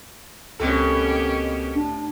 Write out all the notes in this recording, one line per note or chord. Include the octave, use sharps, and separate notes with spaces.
C#2 B2 A#3 C4 C#4 G4 A4
A2 D4